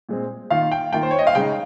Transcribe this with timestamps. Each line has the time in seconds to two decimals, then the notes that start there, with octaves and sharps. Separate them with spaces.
0.09 A#2 G#3 C4
0.50 D#3 A#3 F4 F5
0.72 G5
0.93 D#3 A#3 F4 G5
1.03 C5
1.11 C#5
1.19 D#5
1.27 F5
1.35 C#3 G#3 D#4 G5